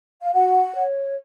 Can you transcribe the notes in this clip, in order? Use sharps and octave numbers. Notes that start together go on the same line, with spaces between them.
F5
F#4 F#5
C#5